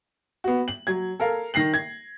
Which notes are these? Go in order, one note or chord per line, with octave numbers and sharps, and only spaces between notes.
B3 F#4
F#7
F#3 G#6
A4 A#4 F5
D#3 A#6 C7 F#7
G#6